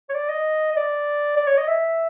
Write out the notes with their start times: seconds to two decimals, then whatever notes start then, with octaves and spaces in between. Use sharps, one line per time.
0.09 C#5
0.14 D5
0.29 D#5
0.72 D#5
0.76 D5
1.37 D5
1.47 C#5
1.58 D#5
1.68 E5